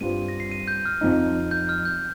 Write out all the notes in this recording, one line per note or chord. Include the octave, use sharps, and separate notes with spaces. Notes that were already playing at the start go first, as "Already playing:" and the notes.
G2 G3 C4 F4 D#7
A#6
C7
D#7
G6
F6
F2 F3 D#4
G6
F6
G6